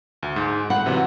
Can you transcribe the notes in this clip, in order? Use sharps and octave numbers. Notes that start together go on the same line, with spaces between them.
D2
G#2
F#5 B5
C3 E3 F#3